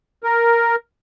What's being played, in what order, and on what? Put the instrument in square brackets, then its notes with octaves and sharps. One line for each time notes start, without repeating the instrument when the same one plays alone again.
[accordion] A#4